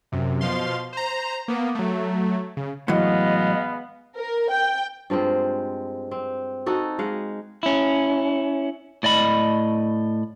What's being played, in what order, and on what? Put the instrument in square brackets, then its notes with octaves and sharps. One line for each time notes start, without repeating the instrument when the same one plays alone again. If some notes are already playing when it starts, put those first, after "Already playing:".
[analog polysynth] F#2 C3
B2 F3 F5 C6
C5 A#5
A#3 B3
F#3 A3
C#3
[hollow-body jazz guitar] A2 E3 F#3 [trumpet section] G#3 B3 F5 [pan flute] D#5
[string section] A#4
G5
[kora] G2 F3 G#3 C4
C4
D#4 F#4 A4
G#3 F5 F#5
[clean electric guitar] C#4 E4
A2 D5 D#5 B5